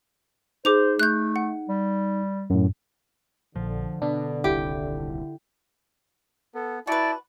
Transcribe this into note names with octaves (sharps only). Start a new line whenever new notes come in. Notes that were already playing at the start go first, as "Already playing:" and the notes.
D#4 G#4 C5 D6 F7
A3 F#6 G6
F#5
G3
F#2 A2
A#1 D3 F3
B2 D4
D#1 C2 E4 G4
B3 A4
E4 F#4 B4 D5 A5